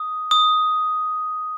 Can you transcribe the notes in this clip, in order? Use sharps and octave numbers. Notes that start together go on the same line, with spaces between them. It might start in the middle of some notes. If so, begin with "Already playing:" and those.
Already playing: D#6
D#6